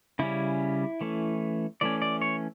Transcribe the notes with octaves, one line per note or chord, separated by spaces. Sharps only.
C#3 G3 C#4 E4
E3 A3 C#4
E3 A3 C#4 D5
D5
C#5